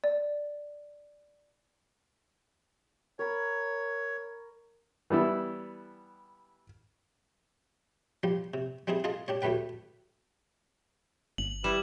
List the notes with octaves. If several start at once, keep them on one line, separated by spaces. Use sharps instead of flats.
D5
A#4 C#5 B5
E3 G3 B3 E4
F3 G3 G4
C3
G3 C4 D#4 E4 G#4
F4 G#4 A4 D#5
D4 G4 C#5
D2 A2 A3 G4 B4 G5
G1 F#7
G3 E4 B4 E7